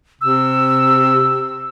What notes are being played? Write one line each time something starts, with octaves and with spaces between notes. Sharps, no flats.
C3 E6